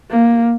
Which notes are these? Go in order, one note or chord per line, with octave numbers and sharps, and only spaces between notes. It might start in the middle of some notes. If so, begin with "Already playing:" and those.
A#3